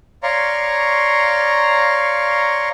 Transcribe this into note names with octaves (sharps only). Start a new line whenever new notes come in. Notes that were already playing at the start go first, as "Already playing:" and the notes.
C#5 D5 F5 A#5 C6 C#6